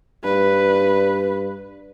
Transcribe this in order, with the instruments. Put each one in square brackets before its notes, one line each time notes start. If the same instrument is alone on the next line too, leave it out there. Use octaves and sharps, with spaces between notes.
[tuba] G2 [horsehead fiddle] B4